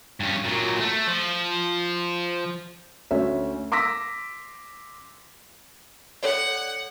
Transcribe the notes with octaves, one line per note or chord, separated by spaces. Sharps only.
G2 C#4
A#2 F#3
A3
F3
D2 C#4 E5
C6 D6 E6 A#6 B6
A4 C#5 D5 F#5